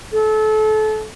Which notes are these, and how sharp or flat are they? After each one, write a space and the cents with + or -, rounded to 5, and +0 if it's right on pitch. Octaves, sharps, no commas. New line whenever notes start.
A4 -30